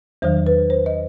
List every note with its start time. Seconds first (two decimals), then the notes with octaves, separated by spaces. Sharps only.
0.22 E2 D#3 F#3 C5
0.47 B4
0.70 C5
0.86 D#5